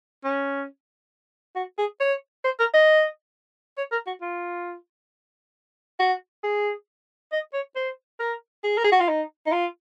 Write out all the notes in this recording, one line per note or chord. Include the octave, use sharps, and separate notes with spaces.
C#4
F#4
G#4
C#5
C5
A#4
D#5
C#5
A#4
F#4
F4
F#4
G#4
D#5
C#5
C5
A#4
G#4
A#4
G#4
F#4
F4
D#4
D#4
F4